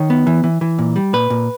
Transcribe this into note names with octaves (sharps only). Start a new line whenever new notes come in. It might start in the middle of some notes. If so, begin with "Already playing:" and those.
Already playing: D#3 C#5
B3
E3
E3
E3
A#2
G3
A#2 B4
A#2